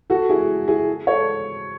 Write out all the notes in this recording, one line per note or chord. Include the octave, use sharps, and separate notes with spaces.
F#4 A4
E4 G#4
E4 G#4
A4 C#5